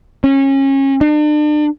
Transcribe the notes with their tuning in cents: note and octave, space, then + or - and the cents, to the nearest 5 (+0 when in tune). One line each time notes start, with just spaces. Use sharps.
C#4 -25
D4 +40